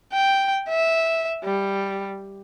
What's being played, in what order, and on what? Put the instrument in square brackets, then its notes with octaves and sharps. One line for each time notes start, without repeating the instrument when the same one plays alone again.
[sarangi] G5
E5
G3